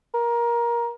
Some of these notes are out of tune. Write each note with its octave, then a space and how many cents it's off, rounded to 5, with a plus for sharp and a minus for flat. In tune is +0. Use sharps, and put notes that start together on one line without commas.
A#4 +20